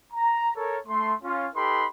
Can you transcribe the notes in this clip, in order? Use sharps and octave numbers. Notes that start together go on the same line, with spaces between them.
A#5
A4 A#4 C#5
A3 C6
C#4 F4
D#4 G4 A4 B4 B5 C6